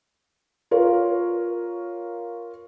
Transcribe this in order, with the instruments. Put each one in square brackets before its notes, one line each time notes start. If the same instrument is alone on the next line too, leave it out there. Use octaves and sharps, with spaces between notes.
[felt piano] F4 A#4 C#5 F5